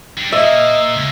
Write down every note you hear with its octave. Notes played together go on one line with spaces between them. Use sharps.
G3 D4
A#2 D#5 E5
C#2